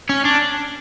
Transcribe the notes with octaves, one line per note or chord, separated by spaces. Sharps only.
C#4
D4